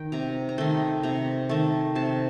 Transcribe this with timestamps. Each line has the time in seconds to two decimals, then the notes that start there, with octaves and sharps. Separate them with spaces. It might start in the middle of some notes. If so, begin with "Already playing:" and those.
Already playing: D#3 G5
0.12 C3 A#5
0.49 A#5
0.58 D#3 A3 C6
1.03 C3 A#5
1.49 D#3 A3 A5
1.95 C3 A5